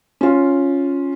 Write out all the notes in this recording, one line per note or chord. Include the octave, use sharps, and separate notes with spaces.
C#4 F4